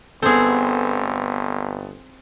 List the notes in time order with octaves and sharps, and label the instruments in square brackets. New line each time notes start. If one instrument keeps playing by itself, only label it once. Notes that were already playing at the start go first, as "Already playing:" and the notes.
[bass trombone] G1 [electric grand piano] B3 A4 [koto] C4 G#4